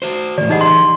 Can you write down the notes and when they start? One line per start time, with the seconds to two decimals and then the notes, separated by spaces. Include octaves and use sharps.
0.02 F#4 C5
0.38 A2 D#3 D5
0.50 E3 D#4 G4 G#4 D#5 F#5
0.61 C6